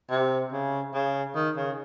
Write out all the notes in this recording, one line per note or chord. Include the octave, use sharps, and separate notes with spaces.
C3
C#3
C#3
D#3
C#3